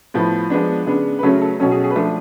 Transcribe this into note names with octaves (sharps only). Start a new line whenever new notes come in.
A2 F3 B3
F3 G#3 B3 D4
C#3 G#3 B3 D4
B4
C#3 F#3 A3 C#4 A4
A4
B2 F#3 C#4 A4
G#4
G#4
B4
F3 A3 D4 A4